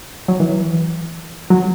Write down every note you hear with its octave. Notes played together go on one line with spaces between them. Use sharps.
F#3
E3
F#3